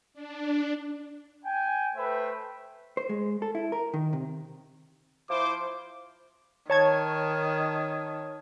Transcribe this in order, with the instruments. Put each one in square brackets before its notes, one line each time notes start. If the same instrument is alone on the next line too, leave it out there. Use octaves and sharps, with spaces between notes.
[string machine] D4
[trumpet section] G5 G#5
A3 B4 C5 E5 G5
[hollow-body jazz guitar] C5
G#3
A4
E4
A#4
D#3
C3
[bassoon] F3 [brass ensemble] E4 C5 [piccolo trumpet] D6
[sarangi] D#3 [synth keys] C#5 A5 G#6